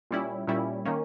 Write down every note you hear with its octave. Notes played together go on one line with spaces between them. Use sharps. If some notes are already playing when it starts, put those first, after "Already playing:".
A#2 G3 C#4 E4
A#2 G3 C#4 E4
D#3 A#3 C#4